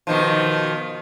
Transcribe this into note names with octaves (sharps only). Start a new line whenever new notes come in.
B2 D#3 F3